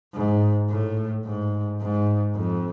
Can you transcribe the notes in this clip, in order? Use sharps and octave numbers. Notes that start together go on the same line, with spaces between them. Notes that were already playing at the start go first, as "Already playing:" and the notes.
G#2
A2
G#2
G#2
F2